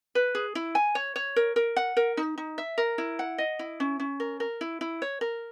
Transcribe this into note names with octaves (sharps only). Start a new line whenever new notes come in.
B4
G#4
E4
G#5
C#5
C#5
A#4
A#4
F#5
A#4
D#4
D#4
E5
A#4
E4
F#5
D#5
E4
C#4
C#4
A#4
A#4
E4
E4
C#5
A#4